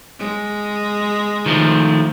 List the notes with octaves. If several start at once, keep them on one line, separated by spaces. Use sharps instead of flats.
G#3
D#3 F3 A3